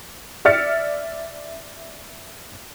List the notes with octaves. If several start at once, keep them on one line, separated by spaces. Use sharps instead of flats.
D5 E5 F6 A6 C#7